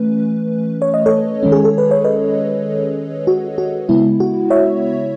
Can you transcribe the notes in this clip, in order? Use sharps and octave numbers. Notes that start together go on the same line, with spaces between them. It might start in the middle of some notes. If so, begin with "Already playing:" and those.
Already playing: E3 A3 C#4 B4
C#5
D#5
A4 C#5
D#3 G#3 C#4
G#4
A4
B4
C#5
B4 D#5
F#4
F#4
C#3 G#3 B3 E4
F#4
C#5 E5